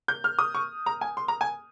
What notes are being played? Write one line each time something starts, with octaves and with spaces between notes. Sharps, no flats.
G6
F6
D#6
C#6
A#5
G#5
C6
A#5
G#5